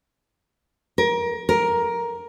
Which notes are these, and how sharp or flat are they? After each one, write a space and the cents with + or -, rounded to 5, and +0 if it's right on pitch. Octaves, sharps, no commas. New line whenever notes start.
A#4 +25
A#4 +10